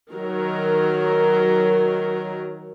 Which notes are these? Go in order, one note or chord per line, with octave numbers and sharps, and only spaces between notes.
D#3 F#3 A#4